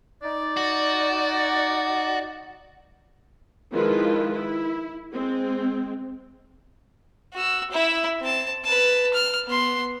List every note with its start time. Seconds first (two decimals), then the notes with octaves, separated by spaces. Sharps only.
0.23 D#4 D5
0.57 F#4
3.73 D#3 F3 G#3 E4 F4 B4
4.33 E4
5.13 G#3 C4
7.33 F#4 E6
7.71 E4 E5
8.20 C4 A5
8.64 B4 A5
9.14 F6
9.47 B3 C6